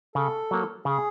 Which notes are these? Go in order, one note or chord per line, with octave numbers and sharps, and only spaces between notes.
C#3 A4
F#3 A#3
C#3 G#4